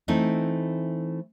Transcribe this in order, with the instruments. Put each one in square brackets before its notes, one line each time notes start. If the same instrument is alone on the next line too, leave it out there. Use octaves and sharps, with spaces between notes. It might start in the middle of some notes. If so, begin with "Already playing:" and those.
[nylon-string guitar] E3 A3 C4 D#4 E4